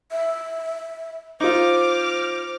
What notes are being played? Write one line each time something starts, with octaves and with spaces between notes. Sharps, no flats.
E5
D#4 F4 C5 D6 F6